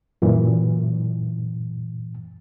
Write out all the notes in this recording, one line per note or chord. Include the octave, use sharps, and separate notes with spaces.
F#2 A#2 E3